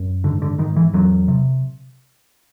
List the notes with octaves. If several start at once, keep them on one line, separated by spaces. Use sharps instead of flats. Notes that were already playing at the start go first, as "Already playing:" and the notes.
Already playing: F#2
G#2 D3
D3
G#2 D#3
E3
E2 F#3
C3